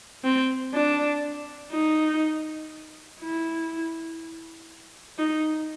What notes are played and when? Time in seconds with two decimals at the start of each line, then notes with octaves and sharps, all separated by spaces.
0.24 C4
0.74 D4
1.73 D#4
3.21 E4
5.19 D#4